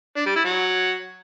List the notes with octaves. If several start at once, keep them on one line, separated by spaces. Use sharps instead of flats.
D4
G3
E4
F#3